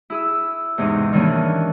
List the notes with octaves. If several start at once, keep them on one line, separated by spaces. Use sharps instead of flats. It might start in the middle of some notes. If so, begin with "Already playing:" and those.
E4 G#4 E6
E2 G#2 C3 D#4
D#3 E3 G3 A#3 C#4 D4